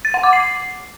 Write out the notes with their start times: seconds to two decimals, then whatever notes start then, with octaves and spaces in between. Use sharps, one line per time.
0.05 A6
0.14 F#5
0.23 D6
0.33 C7